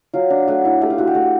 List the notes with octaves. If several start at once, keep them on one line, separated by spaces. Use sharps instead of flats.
F#3 F4
D4
A3 F#4
E4
A3 G4
F4
E4 F#4
G4
A3 F#4